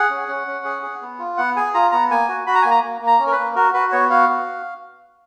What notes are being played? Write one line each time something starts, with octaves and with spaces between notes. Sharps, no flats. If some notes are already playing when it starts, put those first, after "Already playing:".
Already playing: G#4 F#5
C#4
C#4
C#4
G#4
G#4
B3
F4
B3 F#5
G#4 G#5
F4 A#5
B3 A#5
A#3 G#5
F#4
F#4 B5
A#5
A#3 G#5
A#5
A#3
A#3
A#5
C#4
A#4
B4
A#3
F#4 A#4
F#4 B4
B3 C#5
F#4 F5
F#4